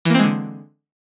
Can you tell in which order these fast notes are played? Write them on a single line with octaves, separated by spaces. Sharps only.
E3 A#3 C4 G#3 D3